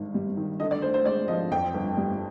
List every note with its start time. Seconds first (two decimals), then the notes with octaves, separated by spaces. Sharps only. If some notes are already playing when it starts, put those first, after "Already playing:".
Already playing: G#1 G2
0.14 G3
0.37 D#3
0.60 D3 D#5
0.71 D5
0.82 D2 C5
0.94 C5
1.05 G#3 D5
1.28 F3 D#5
1.51 F2 G5
1.74 G1
1.97 G3